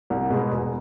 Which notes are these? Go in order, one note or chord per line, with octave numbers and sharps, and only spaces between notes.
C2
B2 G#3 B3
E1